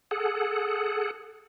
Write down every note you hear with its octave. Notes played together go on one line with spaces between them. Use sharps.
G#4 A4 F#5